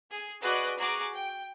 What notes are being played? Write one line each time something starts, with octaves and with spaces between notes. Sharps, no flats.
G#4
F#4 G#4 B4 D5 D#5 F#6
F#4 G#4 A#5 D6
G5